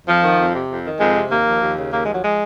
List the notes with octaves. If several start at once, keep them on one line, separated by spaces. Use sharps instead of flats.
F2 F3
D#3
F2
C3
F2
D#3
F2 G#3
C3
D#2 A#3
F3
D#2
C#3
D#2 A#3
G#3
F3 F#3
G#3